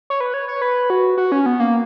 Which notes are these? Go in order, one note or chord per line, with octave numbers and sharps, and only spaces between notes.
C#5
B4
C#5
C#5
B4
F#4
F#4
C#4
B3
A#3